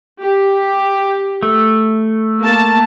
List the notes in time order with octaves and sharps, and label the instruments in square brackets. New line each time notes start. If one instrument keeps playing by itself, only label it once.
[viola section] G4
[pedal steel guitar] A3
[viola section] A#3 A5